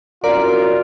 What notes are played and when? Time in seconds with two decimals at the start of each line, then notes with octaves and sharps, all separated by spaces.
0.24 C2 F#2 F4 A#4 D5